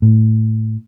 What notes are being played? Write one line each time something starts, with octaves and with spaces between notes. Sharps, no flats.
A2